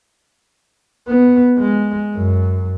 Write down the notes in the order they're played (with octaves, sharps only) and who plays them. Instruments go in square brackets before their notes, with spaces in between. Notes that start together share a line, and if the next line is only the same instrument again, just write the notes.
[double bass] B3
G#3
F#2